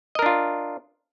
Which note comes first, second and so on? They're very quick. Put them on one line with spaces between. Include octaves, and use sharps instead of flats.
D#5 A#4 D4 F4